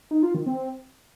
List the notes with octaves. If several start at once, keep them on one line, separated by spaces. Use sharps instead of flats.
D#4
F4
D#3
C4